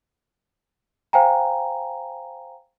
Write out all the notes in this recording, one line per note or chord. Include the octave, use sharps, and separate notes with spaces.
C5 F5 G5 G#5 A#5